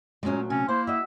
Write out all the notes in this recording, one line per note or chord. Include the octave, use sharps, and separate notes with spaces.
A#2 F#3 G#3 A3 C#4
C3 C#4
A#3 E4 C5
F#4 D#5 E5